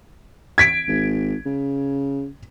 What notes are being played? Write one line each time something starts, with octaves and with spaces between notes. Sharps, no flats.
G#6 B6 D7
G#1
C#3